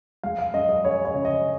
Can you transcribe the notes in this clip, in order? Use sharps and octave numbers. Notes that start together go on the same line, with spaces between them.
G#3 F5
F5
F#2 D#5
D#5
C#4 C#5
C#5
C#3
D#5